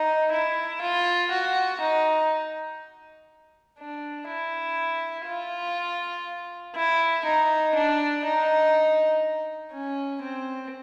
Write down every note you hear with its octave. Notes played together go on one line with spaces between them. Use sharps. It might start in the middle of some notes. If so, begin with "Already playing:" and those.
Already playing: D#4
E4
F4
F#4
D#4
D4
E4
F4
E4
D#4
D4
D#4
C#4
C4